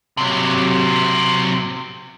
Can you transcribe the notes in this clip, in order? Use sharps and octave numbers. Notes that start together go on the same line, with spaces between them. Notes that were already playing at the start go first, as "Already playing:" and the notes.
C3 F#3